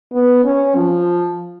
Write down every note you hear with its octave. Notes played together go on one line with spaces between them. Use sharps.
B3
C#4
F3